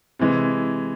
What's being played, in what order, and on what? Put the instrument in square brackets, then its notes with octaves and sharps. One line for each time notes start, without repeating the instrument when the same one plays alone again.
[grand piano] C3 E3 G#3